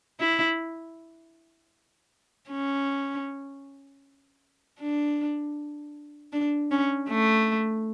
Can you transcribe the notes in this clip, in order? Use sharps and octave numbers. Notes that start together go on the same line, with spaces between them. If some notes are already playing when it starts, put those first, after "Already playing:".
E4
C#4
D4
D4
C#4
A3